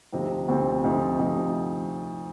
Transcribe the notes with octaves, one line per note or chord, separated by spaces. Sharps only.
D2 C3 F3 C4 D#4
D2 C3 F3 C4 D#4
D2 C3 F3 C4 D#4
D2 C3 F3 C4 D#4